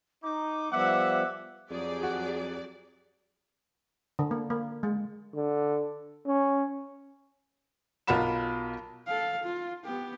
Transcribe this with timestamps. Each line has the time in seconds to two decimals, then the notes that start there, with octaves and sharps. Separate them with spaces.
0.23 D#4 D6
0.72 F3 G3 B3 E5 F#5
1.70 F2 F#3 G4 G#4 D5
2.03 F#4
4.19 D3
4.31 A#3
4.50 A#3
4.83 G#3
5.35 D3
6.26 C#4
8.07 B1 F4 A#4 F#5 B5 E7
9.07 A4 F5
9.43 F4
9.85 B3 G4